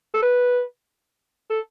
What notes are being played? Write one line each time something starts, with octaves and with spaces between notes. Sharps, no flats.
A4
B4
A4